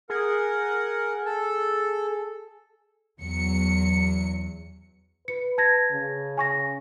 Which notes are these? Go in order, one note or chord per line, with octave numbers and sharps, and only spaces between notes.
G#4 A#4 F#5
A4
E2 F#3 C#7
B4 C#7
A5 G#6 A#6
C#3
G#5 C#6 A#6